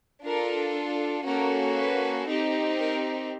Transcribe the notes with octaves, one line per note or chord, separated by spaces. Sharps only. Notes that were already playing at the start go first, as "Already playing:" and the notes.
D4 F4 A4 A#4
A#3 C#4 F#4 A4 A#4
B4
C4 D#4 G4
A#4